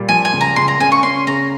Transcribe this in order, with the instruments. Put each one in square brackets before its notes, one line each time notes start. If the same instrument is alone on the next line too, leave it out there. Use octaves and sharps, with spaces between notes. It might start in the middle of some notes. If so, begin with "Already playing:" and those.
Already playing: [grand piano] A#2 G3
[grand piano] F3 [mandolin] G#5
[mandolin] G#5
[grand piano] C#2
[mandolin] A#5
[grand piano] C#2 [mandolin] C6
[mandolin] A#5
[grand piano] C#3 [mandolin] G#5
[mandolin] C#6
[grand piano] C#4 [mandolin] C6
[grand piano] C#3 [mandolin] A#5